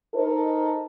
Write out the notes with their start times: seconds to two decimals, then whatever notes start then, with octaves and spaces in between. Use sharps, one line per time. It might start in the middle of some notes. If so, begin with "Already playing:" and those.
0.14 D#4 A4 A#4 C5